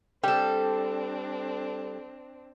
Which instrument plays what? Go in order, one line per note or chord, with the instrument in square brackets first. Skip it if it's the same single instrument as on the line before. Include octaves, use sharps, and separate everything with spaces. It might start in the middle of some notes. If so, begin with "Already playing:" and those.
[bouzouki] G3 A4 [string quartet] C4 D4 [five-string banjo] G4